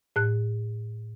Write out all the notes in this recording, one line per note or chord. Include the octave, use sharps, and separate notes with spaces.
A2 F#6